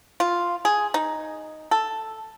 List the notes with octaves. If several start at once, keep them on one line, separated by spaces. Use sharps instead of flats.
F4
G#4
D#4
A4